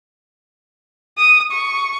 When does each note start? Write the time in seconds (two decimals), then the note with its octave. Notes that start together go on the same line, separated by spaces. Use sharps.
1.18 D#6
1.51 C#6